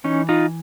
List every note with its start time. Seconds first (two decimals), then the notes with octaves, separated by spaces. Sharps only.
0.04 E3 C#4 D#4
0.29 D#4 F4